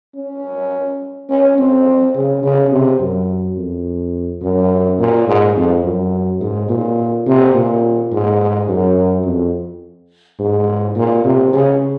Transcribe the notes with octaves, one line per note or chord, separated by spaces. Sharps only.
C#4
C#4
C4
C#3
C#3
C3
F#2
F2
F#2
A#2
G#2
F2
F#2
G#2
A#2
C3
A#2
G#2
F#2
F2
G#2
A#2
C3
C#3